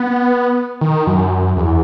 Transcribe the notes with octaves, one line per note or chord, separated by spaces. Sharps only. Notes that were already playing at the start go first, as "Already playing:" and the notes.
Already playing: B3
D#3
F#2
E2